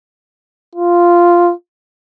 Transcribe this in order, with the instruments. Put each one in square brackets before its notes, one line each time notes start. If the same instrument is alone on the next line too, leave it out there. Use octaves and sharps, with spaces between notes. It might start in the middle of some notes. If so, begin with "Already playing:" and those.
[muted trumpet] F4